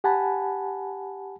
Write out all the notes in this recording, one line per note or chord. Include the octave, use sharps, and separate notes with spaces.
G4 F#5 G#5 A5 B5